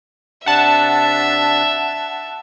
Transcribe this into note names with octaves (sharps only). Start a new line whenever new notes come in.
C3 D4 E5 F#5 A5